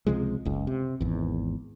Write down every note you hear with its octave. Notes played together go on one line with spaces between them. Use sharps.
C#2 C3 F3 G#3
F#1 C#2
C3
G#1 E2